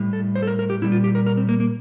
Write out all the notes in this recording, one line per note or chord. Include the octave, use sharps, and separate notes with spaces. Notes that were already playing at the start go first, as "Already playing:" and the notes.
Already playing: A2 G3
A4
C5
A4
A#4
A#4
G4
A#2 G3 E4
F4
G4
A#4
A#4
C4
A#3
A#3